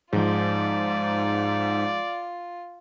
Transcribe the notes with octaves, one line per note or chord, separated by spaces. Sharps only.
G#2 F3 G#3 F4 D5